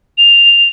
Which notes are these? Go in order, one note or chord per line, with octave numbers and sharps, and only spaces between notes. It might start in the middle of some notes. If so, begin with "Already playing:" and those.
F7